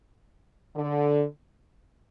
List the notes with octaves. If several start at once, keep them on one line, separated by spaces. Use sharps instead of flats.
D3